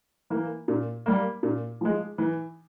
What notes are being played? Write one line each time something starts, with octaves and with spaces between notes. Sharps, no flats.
E3 A#3
A#2
G3 A#3
A#2
F3 G#3
E3